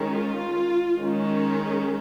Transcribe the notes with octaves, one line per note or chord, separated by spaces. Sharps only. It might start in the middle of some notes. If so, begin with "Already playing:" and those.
Already playing: D#3 G#3 C#4
F4
D#3 G#3 C#4